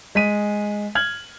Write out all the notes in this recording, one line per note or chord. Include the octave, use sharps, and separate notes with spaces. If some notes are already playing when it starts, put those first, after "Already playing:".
G#3 B6 D#7
F6 G#6 F#7